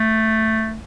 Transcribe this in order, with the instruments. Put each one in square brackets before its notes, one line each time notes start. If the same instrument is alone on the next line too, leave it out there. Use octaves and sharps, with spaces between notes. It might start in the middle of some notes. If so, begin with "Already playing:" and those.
Already playing: [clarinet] A3